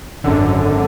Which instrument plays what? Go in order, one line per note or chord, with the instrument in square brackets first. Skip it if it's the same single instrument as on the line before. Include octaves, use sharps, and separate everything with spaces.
[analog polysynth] G#1 F#2 D3